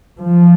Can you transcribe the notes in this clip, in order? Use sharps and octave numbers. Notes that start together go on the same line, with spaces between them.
F3